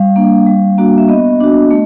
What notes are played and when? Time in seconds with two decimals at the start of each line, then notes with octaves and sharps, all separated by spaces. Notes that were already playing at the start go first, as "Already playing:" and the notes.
Already playing: G3 F5
0.16 A#3 D4
0.46 G3
0.78 A#3 D4 F#4
0.98 E5
1.09 B3 D#5
1.41 D4 F#4
1.71 A3